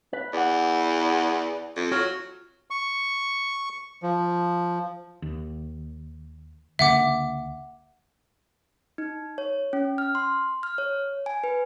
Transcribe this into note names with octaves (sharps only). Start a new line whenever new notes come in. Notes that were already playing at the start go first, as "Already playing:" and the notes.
B4
E2 D5 F#5
F2
F#3 F4 C#5
C#6
F3
D#2
C#2 D3 A#3 E5 F#5 D6
D#4
C#5
C#4
F6
C6
F6
C#5
G#5
B4